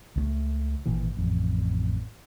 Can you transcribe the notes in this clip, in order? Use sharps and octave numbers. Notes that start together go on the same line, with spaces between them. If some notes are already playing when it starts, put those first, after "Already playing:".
C#2 G3 A3
G#1 A#2 E3
A1 F2